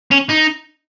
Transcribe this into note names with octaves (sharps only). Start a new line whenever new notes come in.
C#4
D#4